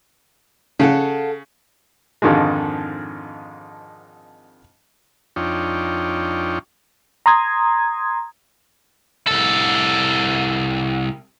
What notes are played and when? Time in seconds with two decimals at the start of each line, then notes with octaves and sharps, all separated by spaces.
0.80 C#3 A4 F5 F#5
2.22 F2 G#2 D3 D#3 F3 G#3
5.36 F2 D4 D#4 F4 C#5 G5
7.26 A#5 C6 D#6 G#6
9.27 C2 A4